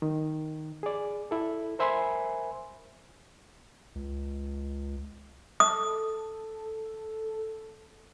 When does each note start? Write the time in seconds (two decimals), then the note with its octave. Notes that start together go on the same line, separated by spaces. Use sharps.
0.02 D#3
0.83 G#4 D5
1.31 E4 A4
1.79 A#4 C5 E5 G#5 B5 C6
3.95 C#2
5.60 A4 D#6